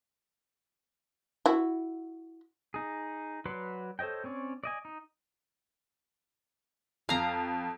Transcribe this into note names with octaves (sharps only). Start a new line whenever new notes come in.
E4 F#4
D#4 G#4
F#3 B4 D5 F#5 C6
A4 C5 C#5 D#5 G5
C4 C#4 C#5 D5
D5 D#5 G#5
D#4
F2 F5 A#5